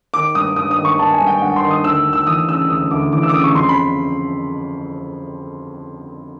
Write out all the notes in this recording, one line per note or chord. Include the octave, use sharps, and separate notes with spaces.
D#3 D6
G2 D#6
G2 D#6
D#6
D#3
C#6
D#3 A5
G#5
G2
G5
G2 F#5
C6
D#3
D#6
D2 E6
D2
E6
E3 D#6
C#3 E6
D2 D#6
D2 D6
E3 D6
E6
D6
C#3 D#6
C#6
F2 C6
B5